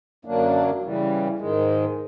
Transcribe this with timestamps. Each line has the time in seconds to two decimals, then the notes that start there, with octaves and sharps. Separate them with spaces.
0.25 F#2 D3 F#3 A#3 D4
0.82 C#3 E3 G3
1.39 G#2 D#3 G#3